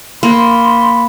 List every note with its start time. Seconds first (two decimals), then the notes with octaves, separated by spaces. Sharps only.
0.23 A#3 B5 C6